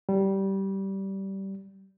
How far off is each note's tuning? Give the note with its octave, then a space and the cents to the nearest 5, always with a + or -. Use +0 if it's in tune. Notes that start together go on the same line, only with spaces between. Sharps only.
G3 -15